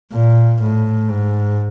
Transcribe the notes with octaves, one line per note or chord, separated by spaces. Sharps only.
A#2
A2
G#2